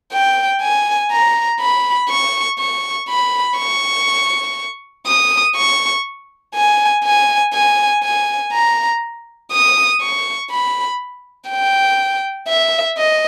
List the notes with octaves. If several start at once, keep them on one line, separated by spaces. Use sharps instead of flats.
G5
G#5
A#5
B5
C#6
C#6
B5
C#6
D#6
C#6
G#5
G#5
G#5
G#5
A#5
D#6
C#6
B5
G5
E5
D#5